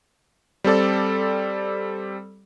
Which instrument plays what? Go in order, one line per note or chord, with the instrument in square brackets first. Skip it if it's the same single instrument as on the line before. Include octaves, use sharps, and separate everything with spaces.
[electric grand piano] G3 C4 A4 D5